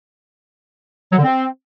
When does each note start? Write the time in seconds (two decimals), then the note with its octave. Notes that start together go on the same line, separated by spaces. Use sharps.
1.12 F#3
1.18 D3
1.23 C4